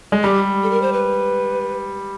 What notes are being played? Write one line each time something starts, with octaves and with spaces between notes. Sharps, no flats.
G#3
G3 G4
A4
A#4
C5
B4